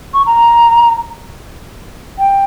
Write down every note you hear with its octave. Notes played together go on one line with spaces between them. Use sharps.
C#6
A#5
G5